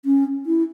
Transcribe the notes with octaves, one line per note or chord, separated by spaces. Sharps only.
C#4
E4